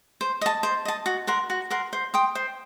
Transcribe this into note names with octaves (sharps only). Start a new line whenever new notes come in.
C5
D#5 A5
C5
D#5 A5
F#4
A#4 F#5 C6
F#4
A#4 F#5 C6
C5
G5 C6 D#6
C5